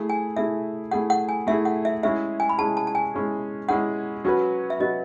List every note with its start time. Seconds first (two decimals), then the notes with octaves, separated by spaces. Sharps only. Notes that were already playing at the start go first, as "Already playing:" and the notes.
Already playing: A3 E4 G#4
0.10 G#5
0.37 A3 E4 G#4 E5
0.91 A3 E4 G#4 F#5
1.10 F#5
1.29 G#5
1.47 A3 E4 G#4 E5
1.65 F#5
1.85 E5
2.03 G#3 C#4 E4 G#4 E5
2.40 G#5
2.49 B5
2.58 G#3 C#4 E4 G#4 A5
2.77 A5
2.87 A5
2.95 G#5
3.14 G#3 C#4 E4 G#4
3.69 G#3 C#4 E4 G#4 F#5
4.25 F#3 C#4 F#4 B4
4.70 E5
4.80 F#3 C#4 F#4 B4 D#5